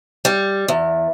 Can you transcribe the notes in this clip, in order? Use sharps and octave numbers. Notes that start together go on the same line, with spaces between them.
G3
E2